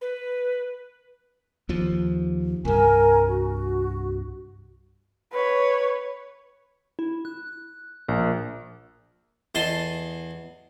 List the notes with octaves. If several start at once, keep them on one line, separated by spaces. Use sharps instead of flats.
B4
D#2 F3
C2 G2 A#4 G#5
F#4
B4 C#5
E4
F#6
A#1 A#4
E2 A4 D#5 A5 C6